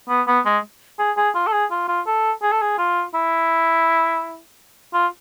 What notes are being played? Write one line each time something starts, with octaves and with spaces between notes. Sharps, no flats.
B3
B3
G#3
G#4
G#4
F4
A4
G#4
F4
F4
A4
G#4
A4
G#4
F4
E4
F4